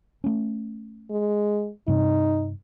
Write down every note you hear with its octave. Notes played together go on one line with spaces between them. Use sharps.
A3 C#4
G#3
G2 C3 D#4